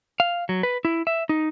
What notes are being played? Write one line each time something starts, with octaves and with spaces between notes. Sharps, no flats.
F5
F#3
B4
E4
E5
D#4